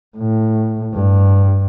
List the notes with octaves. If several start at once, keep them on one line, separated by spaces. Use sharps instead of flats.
A2
G2